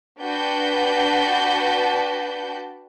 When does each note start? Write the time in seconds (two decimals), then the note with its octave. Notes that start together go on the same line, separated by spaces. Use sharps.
0.22 D4 F#4 B4 G5 A5 G6